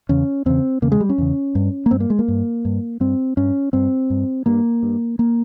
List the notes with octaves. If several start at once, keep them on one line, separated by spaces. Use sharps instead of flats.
E2 C#3 C#4
E2 C#3 C4
E2 C#3 A#3
G#3
G3
C#4
E2 C#3
G2
A#3
G2 C4
A#3
G#3
A#3
G2
G2
G2 C4
G2 C#4
G2 C4
G2
G2 A#3
G2
A#3